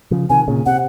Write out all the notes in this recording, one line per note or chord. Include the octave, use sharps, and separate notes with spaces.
C#3 F3
C3 D#3 G#5
A#2 C#3
C3 F#5